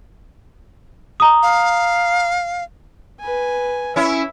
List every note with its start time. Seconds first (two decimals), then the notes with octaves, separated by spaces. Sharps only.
1.20 A#5 D#6
1.43 F5
3.20 B4 G#5
3.96 C#4 E4 E5